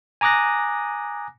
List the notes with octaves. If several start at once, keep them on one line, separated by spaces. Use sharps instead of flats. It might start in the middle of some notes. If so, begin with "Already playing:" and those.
G#5 A#5 D6 D#6 F#6 A#6